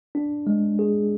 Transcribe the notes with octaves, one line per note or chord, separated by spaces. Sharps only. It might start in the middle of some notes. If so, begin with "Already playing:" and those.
D4
G#3
G#4